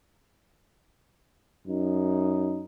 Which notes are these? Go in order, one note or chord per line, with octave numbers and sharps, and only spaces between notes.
F#2 D#4